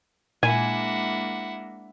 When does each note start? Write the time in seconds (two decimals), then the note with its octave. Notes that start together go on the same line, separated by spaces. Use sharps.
0.43 A#2 G#3 A#3 D4 E4 F#5 G#5